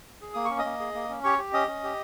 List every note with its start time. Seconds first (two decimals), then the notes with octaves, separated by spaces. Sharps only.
0.21 G#4
0.34 A#3 D#6
0.45 C#6
0.50 C#4
0.59 D#5 D#6
0.65 A#3
0.80 G#4
0.95 A#3
1.09 C#4
1.24 G4 C#5 C#6
1.38 G4
1.53 C#4 D#5 D#6
1.68 C#4
1.84 G4